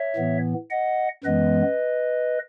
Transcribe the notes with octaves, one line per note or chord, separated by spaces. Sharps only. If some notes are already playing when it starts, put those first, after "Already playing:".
Already playing: C#5 E5
A2 E3 B3
D#5 F#5
F#2 E3 G#3 B3 B4 D#5